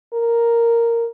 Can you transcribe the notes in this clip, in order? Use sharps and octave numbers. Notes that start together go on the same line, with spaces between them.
A#4